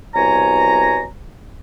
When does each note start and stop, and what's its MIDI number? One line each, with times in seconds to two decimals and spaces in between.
0.15 1.05 36
0.15 1.05 47
0.15 1.05 73
0.15 1.05 80
0.15 1.05 82